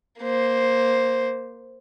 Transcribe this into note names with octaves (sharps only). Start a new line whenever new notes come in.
A#3 C5